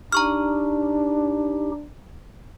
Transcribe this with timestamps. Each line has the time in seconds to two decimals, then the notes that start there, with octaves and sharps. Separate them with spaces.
0.12 D4 D#4 G4 A#5 C#6 F6